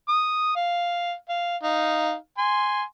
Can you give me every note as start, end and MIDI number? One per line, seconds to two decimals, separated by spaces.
0.09 0.53 87
0.56 1.13 77
1.29 1.57 77
1.63 2.15 63
1.63 2.15 77
2.38 2.83 80
2.38 2.83 84